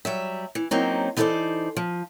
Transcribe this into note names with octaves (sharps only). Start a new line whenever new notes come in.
F#3 G3 E5
E3
F#3 A#3 C4 C#4 D#4
E3 D#4 A4 B4 C5 D5
F3